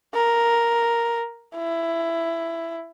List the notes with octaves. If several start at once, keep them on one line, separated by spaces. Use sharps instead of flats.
A#4
E4